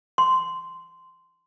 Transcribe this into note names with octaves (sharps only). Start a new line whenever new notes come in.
C6